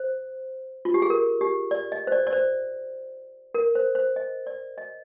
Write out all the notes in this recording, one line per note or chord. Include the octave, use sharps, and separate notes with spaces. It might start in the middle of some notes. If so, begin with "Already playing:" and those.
Already playing: C5
F4
G4
G#4
A#4
G4
D5
D#5
C5
D5
D5
C5
A#4
C5
C5
D#5
D5
D#5